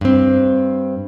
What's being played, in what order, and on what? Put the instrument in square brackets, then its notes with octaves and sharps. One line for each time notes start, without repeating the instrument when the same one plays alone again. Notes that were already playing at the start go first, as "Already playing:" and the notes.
[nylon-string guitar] G2 C4